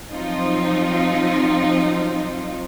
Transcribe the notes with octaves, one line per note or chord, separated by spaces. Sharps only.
F3 F#3 C4 D#4 F4